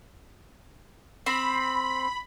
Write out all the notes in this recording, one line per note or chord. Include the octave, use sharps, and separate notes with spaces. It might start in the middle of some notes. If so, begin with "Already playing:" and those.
C4 B5